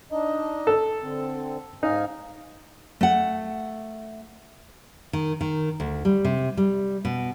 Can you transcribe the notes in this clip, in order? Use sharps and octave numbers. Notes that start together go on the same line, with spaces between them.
D4 D#4 D#5
A4
D3 C4
G#2 D#4 F5 G#5
A3 F#5
D#3
D#3
D2
G3
C3
G3
B2